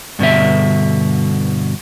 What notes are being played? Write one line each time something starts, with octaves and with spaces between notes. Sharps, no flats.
G2 B2 D3 E5